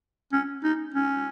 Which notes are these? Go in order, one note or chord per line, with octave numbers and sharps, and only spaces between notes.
C#4
D#4
C#4